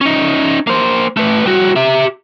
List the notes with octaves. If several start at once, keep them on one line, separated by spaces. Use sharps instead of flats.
C#4 D#4
A#3 C5
A3 B4
G3 F#4
G4 E5